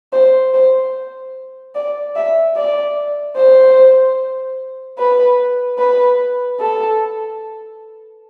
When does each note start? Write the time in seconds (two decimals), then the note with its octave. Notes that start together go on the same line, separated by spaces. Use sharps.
0.13 C5
0.54 C5
1.75 D5
2.16 E5
2.56 D5
3.36 C5
4.98 B4
5.78 B4
6.60 A4